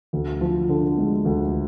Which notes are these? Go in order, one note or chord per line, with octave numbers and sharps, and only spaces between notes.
D2
F3
D3
G#3
D2